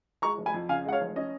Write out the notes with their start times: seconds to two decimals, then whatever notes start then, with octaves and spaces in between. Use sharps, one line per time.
0.22 G#3 A#5 C#6
0.38 F1
0.46 G#5 B5
0.54 F2
0.69 C#3 F5 G#5
0.85 G#3 F#5
0.92 C#5 F5
1.01 F1
1.16 C#4 D#5